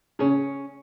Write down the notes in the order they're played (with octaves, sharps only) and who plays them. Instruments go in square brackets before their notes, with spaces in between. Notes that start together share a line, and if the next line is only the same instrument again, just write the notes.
[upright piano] C#3 [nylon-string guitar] C#4